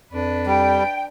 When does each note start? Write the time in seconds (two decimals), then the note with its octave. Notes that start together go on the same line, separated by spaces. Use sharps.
0.13 F2 D4 B4
0.46 G3 G5